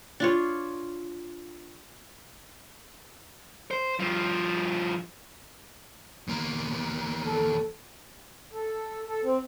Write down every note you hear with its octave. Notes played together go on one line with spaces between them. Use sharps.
D4 F4 C#5
C5
G2 F3
E2 A#3
A4
A4
A4
C4